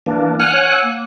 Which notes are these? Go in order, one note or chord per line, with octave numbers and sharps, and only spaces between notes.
E3 A#3 D4
F#5 G#5 F6 F#6
C#5
E6
A#3